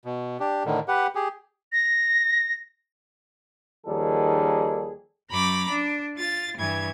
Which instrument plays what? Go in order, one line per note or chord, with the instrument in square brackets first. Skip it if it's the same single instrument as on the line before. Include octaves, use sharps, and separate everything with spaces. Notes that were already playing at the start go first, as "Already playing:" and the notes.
[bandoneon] B2
D4 G4
A2 D3 D#3
G4 B4 F#5
G4 G#4
[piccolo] A#6
[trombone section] D#2 D#3 F3 G3 G#4 A4
[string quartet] F#2 A#5 B5 D6
D4
F4 A6
G2 E3 G#6